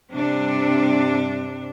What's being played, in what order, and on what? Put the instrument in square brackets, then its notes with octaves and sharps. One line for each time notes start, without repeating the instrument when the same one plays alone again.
[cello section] G2 C3 D4